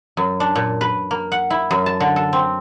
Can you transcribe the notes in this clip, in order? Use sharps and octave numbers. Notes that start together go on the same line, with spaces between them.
F#2
D4
A#2
B4
A#3
F#5
E4
F#2
A5
D3
A4
C4